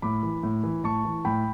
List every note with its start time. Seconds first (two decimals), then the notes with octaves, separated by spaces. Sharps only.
0.02 A2 B5 D6
0.23 E3
0.43 A2
0.63 E3
0.84 A2 A5 C#6
1.05 E3
1.25 A2 G5 B5